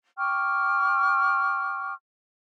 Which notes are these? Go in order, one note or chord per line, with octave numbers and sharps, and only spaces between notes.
G5 C#6 D6 F6